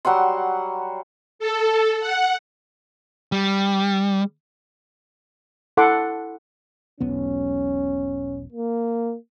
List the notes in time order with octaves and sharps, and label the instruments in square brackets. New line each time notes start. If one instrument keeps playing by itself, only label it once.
[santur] F#3 G3 F#5 C6
[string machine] A4
F#5
[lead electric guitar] G3
[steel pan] E4 A4 F#5 C6 D6
[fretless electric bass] E1 B1 B3 [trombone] C#4
[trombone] A#3